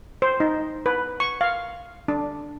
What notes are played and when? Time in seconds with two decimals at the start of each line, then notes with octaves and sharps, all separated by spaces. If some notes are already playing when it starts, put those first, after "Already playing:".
0.22 C5
0.40 D#4
0.86 B4
1.20 C#6
1.41 F5
2.08 D4